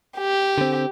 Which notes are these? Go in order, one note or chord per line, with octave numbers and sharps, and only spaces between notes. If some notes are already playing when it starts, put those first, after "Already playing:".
G4
D3 C4